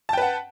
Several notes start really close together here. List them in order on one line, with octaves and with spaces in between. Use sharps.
A5 G5 B4 F#5